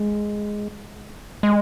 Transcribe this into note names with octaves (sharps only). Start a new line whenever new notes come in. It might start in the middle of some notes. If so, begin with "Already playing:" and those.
Already playing: G#3
G#3